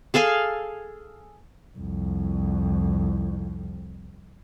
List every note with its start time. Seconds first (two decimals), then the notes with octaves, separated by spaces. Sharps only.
0.14 G#4 A4 F5 G#5
1.78 C2 F2